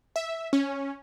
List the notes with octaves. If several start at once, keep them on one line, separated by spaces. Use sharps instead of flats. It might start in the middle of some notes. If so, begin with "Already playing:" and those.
E5
C#4